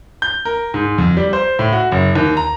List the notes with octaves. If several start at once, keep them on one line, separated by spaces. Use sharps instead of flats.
G6
A#4
G#2
F2
G3
C5
A2
F#4
F#1
D#2
A#5